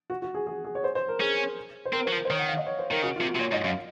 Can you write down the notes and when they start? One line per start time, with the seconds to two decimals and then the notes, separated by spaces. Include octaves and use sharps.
0.10 F#4
0.22 F#4
0.34 G#4
0.47 G#4
0.65 G#4
0.75 C#5
0.84 C5
0.95 C5
1.08 A#4
1.20 C#4 G#4
1.85 C5
1.93 C4 A#4
2.06 F#3 C5
2.12 F3
2.25 C5
2.30 D#3 C#5
2.39 F#5
2.48 F5
2.57 D#5
2.66 C#5
2.79 C5
2.91 D#3 A#4
3.03 C#3 F#4
3.16 F4
3.21 C3
3.28 F#4
3.35 C3
3.39 A#2 C#5
3.52 G#2 D#5
3.64 F#2 F5